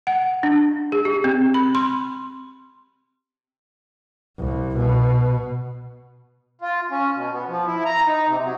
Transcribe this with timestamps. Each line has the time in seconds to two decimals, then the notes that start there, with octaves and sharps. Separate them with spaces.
0.07 F#5
0.43 D4
0.92 G#4
1.05 G4
1.24 C4
1.54 B5
1.75 C6
4.39 C2
4.77 B2
6.61 F4
6.91 C#4
7.14 B2
7.33 B3
7.48 F3
7.66 E4
7.85 A#5
8.07 D#4
8.27 C3
8.44 F#3